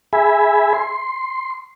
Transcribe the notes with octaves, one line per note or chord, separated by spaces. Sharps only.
G#4 E5 G#5 B5
C6